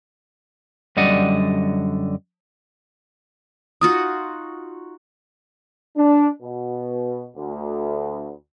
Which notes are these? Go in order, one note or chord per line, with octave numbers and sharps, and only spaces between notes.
F#2 D3 G3 D5 D#5 F#5
D#4 F4 F#4 D#6
D4
B2
D2